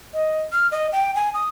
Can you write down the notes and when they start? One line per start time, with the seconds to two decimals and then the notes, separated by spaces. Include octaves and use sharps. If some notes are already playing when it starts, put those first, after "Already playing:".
0.13 D#5
0.52 F6
0.72 D#5
0.92 G5
1.15 G#5
1.34 D#6